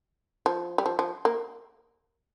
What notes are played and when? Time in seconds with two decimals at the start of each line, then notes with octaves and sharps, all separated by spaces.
0.46 F3
0.78 G3
0.86 F3
0.99 F3
1.25 A#3